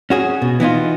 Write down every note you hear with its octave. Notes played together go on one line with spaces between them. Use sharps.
C#4 F#4 G#4
B2
E3 B3 D#4 F4